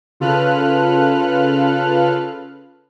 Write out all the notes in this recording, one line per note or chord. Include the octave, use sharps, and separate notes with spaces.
C#3 F4 A4 B4 F6 F#6